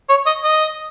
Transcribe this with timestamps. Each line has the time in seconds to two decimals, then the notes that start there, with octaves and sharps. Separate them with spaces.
0.09 C#5
0.26 D#5
0.44 D#5